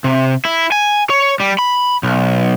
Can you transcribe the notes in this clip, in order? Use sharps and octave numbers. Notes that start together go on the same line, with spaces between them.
C3
E4
G#5
C#5
G3
B5
B1